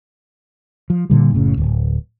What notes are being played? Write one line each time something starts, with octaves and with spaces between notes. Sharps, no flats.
F3
A#2 D3 G3
F#1 A2 C#3
D1